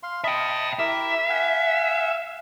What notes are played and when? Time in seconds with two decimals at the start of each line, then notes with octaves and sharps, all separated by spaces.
0.03 F5 C6
0.24 D#5 E5 G5 A5 B5
0.79 E4 G4 A#4 E5
1.30 F5 F#5 G#5